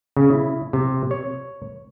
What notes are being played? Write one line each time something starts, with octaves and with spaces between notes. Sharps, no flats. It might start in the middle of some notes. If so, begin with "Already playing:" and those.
C#3
E4
C3
C#5